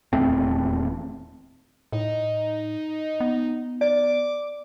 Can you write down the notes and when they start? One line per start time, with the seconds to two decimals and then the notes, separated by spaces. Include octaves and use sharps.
0.13 D#1 E2 A3 C4
1.92 A2 D#4
3.20 B3
3.81 D5 D6